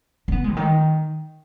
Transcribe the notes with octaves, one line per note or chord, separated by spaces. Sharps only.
C#4
B3
G#3
C#3
D#3